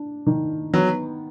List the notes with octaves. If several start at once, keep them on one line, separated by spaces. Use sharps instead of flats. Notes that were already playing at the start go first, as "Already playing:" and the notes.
Already playing: D4
D#3
F#3 B3